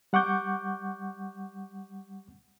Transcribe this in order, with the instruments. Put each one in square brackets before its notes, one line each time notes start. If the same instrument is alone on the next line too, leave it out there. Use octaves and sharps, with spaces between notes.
[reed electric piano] G3 F#5 C#6 D6 G6